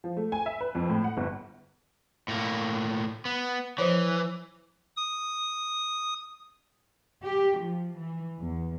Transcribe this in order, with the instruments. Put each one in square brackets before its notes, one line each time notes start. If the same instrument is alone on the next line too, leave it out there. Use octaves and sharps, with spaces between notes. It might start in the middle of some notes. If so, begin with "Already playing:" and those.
[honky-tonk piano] F3
A3
G#5
E5
B4
F2
A2
F#5
G1
[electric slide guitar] A2 A#3
B3
[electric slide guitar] E3 [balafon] F3 C5 C#5
[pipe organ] D#6
[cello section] G4
F3
E3
E2